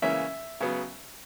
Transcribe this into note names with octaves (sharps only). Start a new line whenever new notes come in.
C#3 E3 A#3 C#4 E5
C#3 F#3 B3